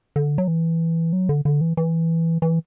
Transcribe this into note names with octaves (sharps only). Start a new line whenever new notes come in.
D3
F#3
E3
F#3
D3
D3
E3
E3
E3